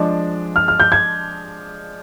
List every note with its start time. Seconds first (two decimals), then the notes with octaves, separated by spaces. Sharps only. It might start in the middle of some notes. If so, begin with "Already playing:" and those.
Already playing: F3 G#3 D4
0.56 F6
0.68 F6
0.80 G6
0.92 G#6